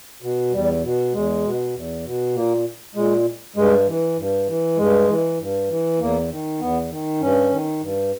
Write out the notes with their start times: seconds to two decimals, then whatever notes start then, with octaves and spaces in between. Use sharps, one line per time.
0.22 B2
0.52 E2 G3
0.83 B2
1.13 E2 G#3
1.44 B2
1.74 E2
2.04 B2
2.35 A#2 A#3
2.95 A#2 G#3
3.56 G2 G#3
3.87 E3
4.17 G2
4.47 E3
4.77 G2 G#3
5.08 E3
5.39 G2
5.69 E3
5.99 E2 A#3
6.30 D#3
6.60 E2 B3
6.91 D#3
7.21 G2 C#4
7.51 D#3
7.81 G2